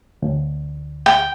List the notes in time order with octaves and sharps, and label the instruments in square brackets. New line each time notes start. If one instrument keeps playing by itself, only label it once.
[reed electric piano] D2
[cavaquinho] G5